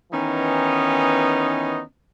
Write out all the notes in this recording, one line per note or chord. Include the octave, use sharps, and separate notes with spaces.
D#3 E3 B3 C#4 D#4